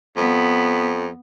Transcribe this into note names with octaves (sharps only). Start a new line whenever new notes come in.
F2 B3